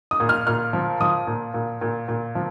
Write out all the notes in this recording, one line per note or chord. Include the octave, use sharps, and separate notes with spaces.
D#6
A#2
F6
A#2 F6
F3
F3 D#6
A#2
A#2
A#2
A#2
F3